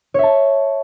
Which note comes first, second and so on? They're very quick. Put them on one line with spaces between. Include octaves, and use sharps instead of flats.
C#5 E5 A5